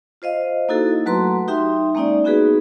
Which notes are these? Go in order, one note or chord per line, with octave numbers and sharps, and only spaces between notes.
F4 C5 D#5 F5
A#3 D#4 E4 F#4 A4
F#3 A3 F#4 B4 A#5 C6
D#4 G4 E5 G5 C6
G#3 A#3 C#4 D#4 D5
B3 D#4 F#4 G#4 B4